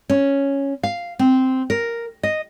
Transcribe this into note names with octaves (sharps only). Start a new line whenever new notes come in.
C#4
F5
C4
A#4
D#5